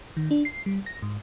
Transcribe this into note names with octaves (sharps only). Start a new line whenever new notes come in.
D#3
D4
C7
G3
A#6
G#2